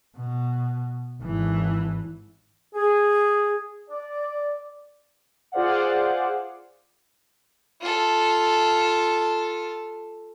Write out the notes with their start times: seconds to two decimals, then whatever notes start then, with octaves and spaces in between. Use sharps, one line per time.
0.17 B2
1.22 G#1 E3
2.75 G#4
3.89 D5
5.52 F4 G#4 C5 D5 F5 F#5
7.81 F4 A4